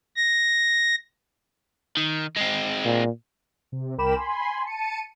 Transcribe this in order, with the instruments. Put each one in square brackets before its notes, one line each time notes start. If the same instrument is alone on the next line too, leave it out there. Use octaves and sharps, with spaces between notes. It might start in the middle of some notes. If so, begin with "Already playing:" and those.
[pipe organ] A#6
[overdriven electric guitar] D#3
G#3 C4
[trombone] A#2
[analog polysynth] C3
C2 A#4 G5 B5 D6 E7
G#5 B5 C6
A5 C#7 D#7